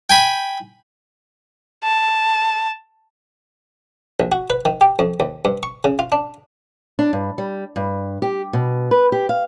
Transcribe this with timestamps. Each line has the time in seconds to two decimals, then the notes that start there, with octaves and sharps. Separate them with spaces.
0.10 G5 G#5 B5
1.84 A5
4.20 A#1
4.32 F#4
4.50 B4
4.65 D#3
4.81 G4
4.99 F2
5.20 D#2
5.45 G2
5.63 C#6
5.84 C#3
5.99 F4
6.12 D4
6.99 D4
7.13 G2
7.38 G3
7.76 G2
8.22 G4
8.53 B2
8.91 B4
9.12 G4
9.29 F5